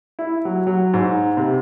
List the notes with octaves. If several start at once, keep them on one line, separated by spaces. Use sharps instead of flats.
E4
F#3
F#3
G#2
C3